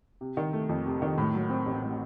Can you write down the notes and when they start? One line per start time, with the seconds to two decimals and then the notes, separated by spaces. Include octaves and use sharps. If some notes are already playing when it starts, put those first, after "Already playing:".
0.21 C3
0.37 D#3
0.53 A3
0.69 F2
0.86 C3
1.02 D#3
1.18 A2
1.34 F#3
1.50 C4
1.66 A1
1.82 A2